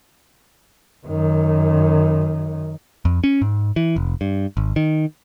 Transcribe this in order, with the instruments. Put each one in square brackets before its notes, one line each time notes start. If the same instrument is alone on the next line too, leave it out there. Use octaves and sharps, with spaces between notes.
[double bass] F#2 D#3
[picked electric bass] F2
C#4
G#2
E3
F1
G2
G#1
D#3